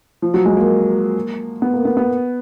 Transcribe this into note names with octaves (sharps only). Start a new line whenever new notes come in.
F3
F#3
G#3
A#3
B3
A#3
B3
B3